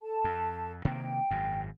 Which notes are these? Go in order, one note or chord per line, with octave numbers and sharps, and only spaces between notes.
A4 A5
F2
C3 D#3 A#3 G5
G#1 F#2